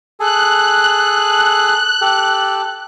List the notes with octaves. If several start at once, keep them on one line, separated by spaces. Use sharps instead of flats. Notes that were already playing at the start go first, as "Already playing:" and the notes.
G#4 A4 F#6
G4 A4